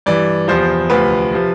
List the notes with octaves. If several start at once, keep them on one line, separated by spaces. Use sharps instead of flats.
G2 E3 D5
E2 C3 F3 C5
D2 C3 F3 B4
C3 F3